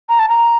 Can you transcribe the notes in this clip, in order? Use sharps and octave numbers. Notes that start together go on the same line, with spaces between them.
A#5
A5
A#5